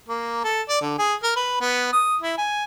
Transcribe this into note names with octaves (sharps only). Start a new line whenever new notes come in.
A#3
A4
D5
D3
G#4
A#4
B4
B3
D#6
E4
G#5